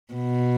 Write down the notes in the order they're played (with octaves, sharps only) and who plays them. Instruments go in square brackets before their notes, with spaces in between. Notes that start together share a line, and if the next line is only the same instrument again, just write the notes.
[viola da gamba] B2